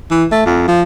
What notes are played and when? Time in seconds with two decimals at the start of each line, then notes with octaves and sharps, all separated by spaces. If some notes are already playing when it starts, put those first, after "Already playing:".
0.11 E3
0.32 A3
0.46 F2
0.68 F3